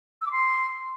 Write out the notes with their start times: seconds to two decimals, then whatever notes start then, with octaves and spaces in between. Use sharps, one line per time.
0.21 E6
0.26 D6
0.31 C6